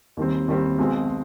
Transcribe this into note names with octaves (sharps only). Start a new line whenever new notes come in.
D#2 D#3 G3 C4
D#2 D#3 G3 C4
B1 B2 G#3 C4